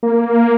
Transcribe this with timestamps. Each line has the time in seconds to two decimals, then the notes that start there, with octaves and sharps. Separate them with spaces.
0.03 A#3